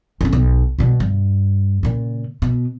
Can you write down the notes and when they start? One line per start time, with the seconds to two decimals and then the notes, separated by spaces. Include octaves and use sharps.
0.21 A1 C#4
0.33 B1
0.79 B2 G3
1.00 G2
1.83 A#2 C#3
2.42 B2